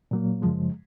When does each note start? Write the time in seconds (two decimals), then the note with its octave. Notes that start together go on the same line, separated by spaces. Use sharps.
0.11 A#2 F#3 A#3
0.42 F#2 C#3 F3 G#3